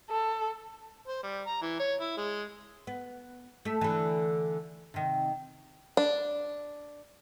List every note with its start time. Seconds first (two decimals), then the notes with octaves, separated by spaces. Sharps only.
0.10 A4
1.08 C5
1.23 G3
1.47 A#5
1.62 E3
1.79 C#5
2.01 E4
2.17 G#3
2.87 B3
3.65 A3 E5
3.81 D3 E3
4.94 C3 D#3
5.97 D4